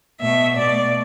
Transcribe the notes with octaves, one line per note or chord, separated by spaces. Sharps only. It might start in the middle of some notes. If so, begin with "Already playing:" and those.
B2 A3 E5
B2 A3 D5